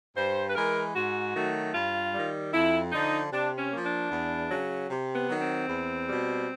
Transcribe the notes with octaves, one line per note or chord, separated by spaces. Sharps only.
G2 C5
B4
E3 G#3 A#4
G#2 F#4
D#3 F#3 A3
G2 F4
D#3 G3
F2 E4
D3 F3 D#4
C3 D4
C#4
F3 A#3
D4
E2
C#3 F#3
C3
B3
D#3 F#3
C4
E2
B2 G3